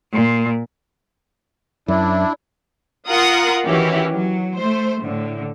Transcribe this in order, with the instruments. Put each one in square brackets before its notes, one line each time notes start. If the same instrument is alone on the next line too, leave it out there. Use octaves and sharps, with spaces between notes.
[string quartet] A#2
[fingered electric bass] F#2 [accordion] D4 E4
[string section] F4 A#4 F5 F#5 D#6
D#3 E3 C#4 E4 F#4 G4
F#3
A3 C5
A2 D3